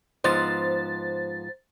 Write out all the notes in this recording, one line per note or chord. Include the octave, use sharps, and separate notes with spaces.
G#2 F3 B3 C5 A6